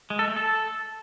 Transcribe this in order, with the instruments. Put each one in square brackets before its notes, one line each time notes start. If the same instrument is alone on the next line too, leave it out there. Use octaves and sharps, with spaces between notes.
[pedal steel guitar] G#3
A4
A3
A4